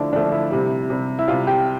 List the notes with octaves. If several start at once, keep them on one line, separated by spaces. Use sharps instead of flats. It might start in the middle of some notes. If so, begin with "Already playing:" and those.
Already playing: D3 F3 A3 D4 E4
D3 F3 A3 D4
E4
C3 G3
C3 G3
E4
C3 G3 F4
G4